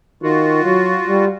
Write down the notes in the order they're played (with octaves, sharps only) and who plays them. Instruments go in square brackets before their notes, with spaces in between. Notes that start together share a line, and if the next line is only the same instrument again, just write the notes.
[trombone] D#3 [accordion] F4 F#4
[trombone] F#3
G3